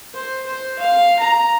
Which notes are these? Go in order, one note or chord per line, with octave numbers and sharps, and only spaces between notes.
C5
C5
F5
A#5